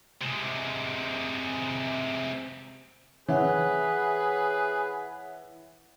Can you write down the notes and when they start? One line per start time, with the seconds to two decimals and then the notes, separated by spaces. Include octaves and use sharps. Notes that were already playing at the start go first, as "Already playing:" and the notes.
0.21 C3 G#3
3.28 E3 G#4 B4 C#5 E5 F#5